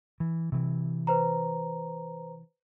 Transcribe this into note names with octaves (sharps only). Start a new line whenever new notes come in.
E3
C3 E3
B4 C5 A#5